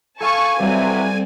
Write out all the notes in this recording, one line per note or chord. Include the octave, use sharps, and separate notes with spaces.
A4 F5 G#5 A5 C#6 C#7
C3 E3 F#3 G3 C4 A4 D#7